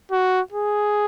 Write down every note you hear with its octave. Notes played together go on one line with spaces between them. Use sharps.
F#4
G#4